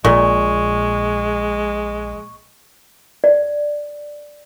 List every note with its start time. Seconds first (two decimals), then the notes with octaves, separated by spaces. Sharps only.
0.05 A#1 A#2 G#3 C#6
3.24 D5